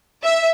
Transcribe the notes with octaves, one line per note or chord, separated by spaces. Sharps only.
E5